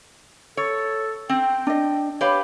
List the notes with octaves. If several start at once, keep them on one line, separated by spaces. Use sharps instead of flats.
A4 C#5
C4 G5
D4 D#5
G4 B4 C#5 F5